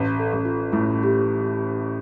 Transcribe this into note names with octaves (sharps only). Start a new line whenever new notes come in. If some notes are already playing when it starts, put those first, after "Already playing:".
Already playing: A1
A4
A1
F4
A2 E4
G4